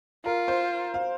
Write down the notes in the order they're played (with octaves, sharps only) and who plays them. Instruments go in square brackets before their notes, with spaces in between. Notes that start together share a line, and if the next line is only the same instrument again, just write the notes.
[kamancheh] F4 [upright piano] A#4
[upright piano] C5
F5